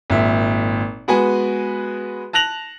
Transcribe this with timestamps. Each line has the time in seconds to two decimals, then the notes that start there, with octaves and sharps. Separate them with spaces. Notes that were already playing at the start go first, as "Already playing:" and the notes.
0.10 G#1 A#2 E5
1.08 G#3 B3 F#4 B4 G#5
2.33 A5 F#6 A#6 F7 F#7